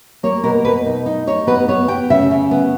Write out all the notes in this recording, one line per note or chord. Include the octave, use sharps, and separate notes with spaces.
A#3 C#5
B2 A#4
B2 B4
D#4
D#4
D#4 C#5
B3 B4
B3 C#5
B3 G5
C#3 E5
C#3
B3